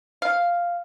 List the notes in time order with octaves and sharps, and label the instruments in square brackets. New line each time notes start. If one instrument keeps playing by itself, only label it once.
[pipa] F5